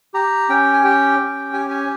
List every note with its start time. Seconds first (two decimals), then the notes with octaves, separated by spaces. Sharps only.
0.14 G4 A#5
0.49 C#4 G5
0.73 G#5
0.84 G4 G5
1.19 C#4
1.53 G4 G#5
1.71 G#5